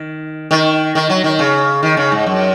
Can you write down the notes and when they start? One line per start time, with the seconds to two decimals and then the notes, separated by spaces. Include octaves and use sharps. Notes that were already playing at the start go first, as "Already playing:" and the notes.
Already playing: D#3
0.51 D#3
0.95 D#3
1.10 F#3
1.24 D#3
1.39 C#3
1.83 D#3
1.97 C#3
2.12 G#2
2.26 F#2